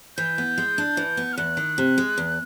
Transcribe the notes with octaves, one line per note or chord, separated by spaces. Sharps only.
E3 G6
B3
G#3
D4
E3
B3
F6
E2 F#6
D#3
C3
G#3
E2